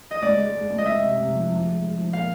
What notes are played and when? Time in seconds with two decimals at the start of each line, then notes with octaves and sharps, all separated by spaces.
0.11 D#5
0.22 C#2 D5
0.37 G#3
0.54 G#3
0.70 C#2
0.78 D#5
0.86 C#2 E5
1.02 C3
1.18 C3
1.33 F3
1.50 F3
1.65 G#3
1.81 G#3
1.97 F3
2.13 A#2 F5